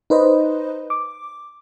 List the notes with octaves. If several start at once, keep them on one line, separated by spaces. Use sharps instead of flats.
D#4 B4 C5 D#5
D6